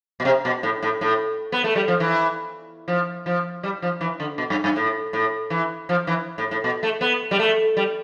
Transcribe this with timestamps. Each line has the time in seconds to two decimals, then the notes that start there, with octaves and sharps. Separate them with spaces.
0.20 B2
0.25 C3
0.45 B2
0.63 A2
0.83 A2
1.01 A2
1.52 B3
1.64 A3
1.75 G3
1.88 F3
2.00 E3
2.88 F3
3.26 F3
3.63 G3
3.82 F3
4.01 E3
4.20 D3
4.38 B2
4.50 G2
4.64 G2
4.76 A2
5.13 A2
5.50 E3
5.89 F3
6.07 E3
6.38 A2
6.51 A2
6.64 B2
6.83 A3
7.01 B3
7.31 G3
7.39 A3
7.77 G3